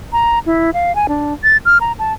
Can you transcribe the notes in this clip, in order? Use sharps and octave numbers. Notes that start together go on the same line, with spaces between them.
A#5
E4
F5
G#5
D4
A6
F6
A#5
A5